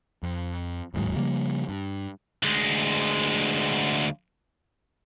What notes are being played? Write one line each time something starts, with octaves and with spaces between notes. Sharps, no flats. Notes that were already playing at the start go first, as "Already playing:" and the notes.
F2
D1 D#2 G#2 F#3
C#3 F3 G3 A#3
G2
D2 G#3